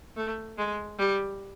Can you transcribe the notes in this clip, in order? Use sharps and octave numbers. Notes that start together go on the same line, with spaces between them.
A3
G#3
G3